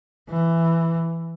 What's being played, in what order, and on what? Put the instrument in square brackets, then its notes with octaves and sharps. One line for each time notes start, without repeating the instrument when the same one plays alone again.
[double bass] E3